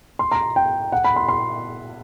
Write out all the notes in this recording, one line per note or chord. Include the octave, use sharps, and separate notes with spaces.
C6
A#5
G5
F#5
B5
C6
C6